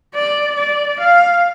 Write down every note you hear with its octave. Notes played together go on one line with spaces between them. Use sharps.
D5
D5
F5